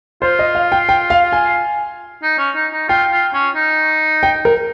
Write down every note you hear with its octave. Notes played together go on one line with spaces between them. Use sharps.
F4 C5
D#5
F5
G5
G5
F5
G#5
D#4
C#4
D#4
D#4
F4 G5
F4
C#4
D#4
G5
A#4